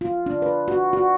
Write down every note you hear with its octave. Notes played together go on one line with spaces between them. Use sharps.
F4
D4
B4
F#4
F#4